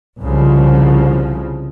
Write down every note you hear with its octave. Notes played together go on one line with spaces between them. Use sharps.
C2 C#3 F3